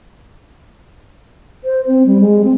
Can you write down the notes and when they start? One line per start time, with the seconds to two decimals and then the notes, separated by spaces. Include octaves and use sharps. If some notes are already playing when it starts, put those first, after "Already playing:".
1.64 C5
1.87 C4
2.06 G3
2.21 G#3
2.44 C4